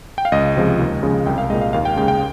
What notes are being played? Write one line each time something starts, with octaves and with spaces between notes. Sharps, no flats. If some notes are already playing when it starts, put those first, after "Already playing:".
G5
F5
C#2 D#5
C3 F3 G#3
D#2
C#3 F3 G#3
C2 G5
F5
A#2 G#3 D#5
F5
D#2 F5
G5
C#3 G#3 G5
G5